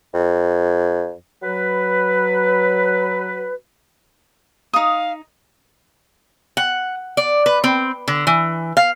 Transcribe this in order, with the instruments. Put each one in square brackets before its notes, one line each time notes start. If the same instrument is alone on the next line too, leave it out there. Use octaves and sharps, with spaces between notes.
[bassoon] F2
[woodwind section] F#3 B4
[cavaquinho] D#4 D#6 [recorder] F5
[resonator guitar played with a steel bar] F#5
D5
B4
C4
D3
E3
F5